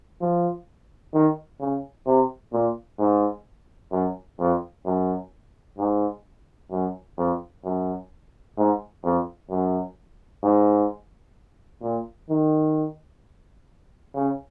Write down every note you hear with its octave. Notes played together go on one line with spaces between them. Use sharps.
F3
D#3
C#3
C3
A#2
G#2
F#2
F2
F#2
G#2
F#2
F2
F#2
G#2
F2
F#2
G#2
A#2
D#3
C#3